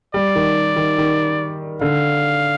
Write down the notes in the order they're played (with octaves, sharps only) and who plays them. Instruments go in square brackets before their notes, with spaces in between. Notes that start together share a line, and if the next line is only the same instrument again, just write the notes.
[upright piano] G3 [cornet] D5
[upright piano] D#3
D#3
D#3
[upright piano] D3 [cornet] F5